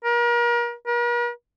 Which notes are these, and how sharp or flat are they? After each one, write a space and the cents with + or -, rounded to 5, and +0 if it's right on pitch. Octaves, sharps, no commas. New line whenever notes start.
A#4 +35
A#4 +45